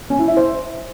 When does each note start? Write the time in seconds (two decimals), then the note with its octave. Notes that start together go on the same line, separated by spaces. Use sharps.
0.10 C#4
0.19 E4
0.28 E5
0.37 C5